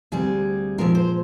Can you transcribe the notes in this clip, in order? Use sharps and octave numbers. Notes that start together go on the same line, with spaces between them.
D2 C3 G3 G#4
A#2 F3 G#3 A#4
C5